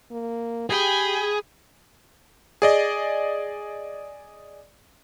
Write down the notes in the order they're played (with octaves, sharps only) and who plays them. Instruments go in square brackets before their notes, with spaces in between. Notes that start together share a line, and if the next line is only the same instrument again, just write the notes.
[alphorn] A#3
[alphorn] G4 [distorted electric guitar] G#4 [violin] G5 B5
[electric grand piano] G#4 D5 D#5